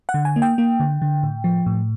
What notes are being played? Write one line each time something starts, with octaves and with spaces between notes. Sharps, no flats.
F#5
D3
G#5
A#3
G5
A#3
D3
D3
A2
F3
A2